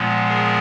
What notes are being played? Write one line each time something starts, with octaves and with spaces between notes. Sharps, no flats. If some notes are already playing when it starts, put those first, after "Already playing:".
Already playing: A#2 F3 G#3 B3
G#4 A#4